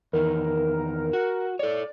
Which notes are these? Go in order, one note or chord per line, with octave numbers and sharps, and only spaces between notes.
E2 D#3 A#4
F#4
A4 C#5 D5